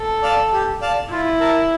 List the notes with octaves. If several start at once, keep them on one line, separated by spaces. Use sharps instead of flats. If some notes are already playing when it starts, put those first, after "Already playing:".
Already playing: A4
D5 F5 A5
G4
D5 F5 A5
E4 F4
A#4 E5 A5